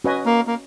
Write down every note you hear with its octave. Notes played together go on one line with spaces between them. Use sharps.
C#4 F#4 B4 D#5 G#5
A#3
A#3